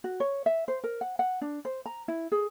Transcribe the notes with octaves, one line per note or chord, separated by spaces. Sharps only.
F#4
C#5
E5
C5
A#4
F#5
F#5
D4
C5
A#5
E4
G#4